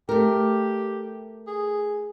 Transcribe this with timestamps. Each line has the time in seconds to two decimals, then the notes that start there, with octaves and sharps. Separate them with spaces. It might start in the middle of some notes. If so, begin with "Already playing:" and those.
0.09 A3 G4 A#4
1.47 G#4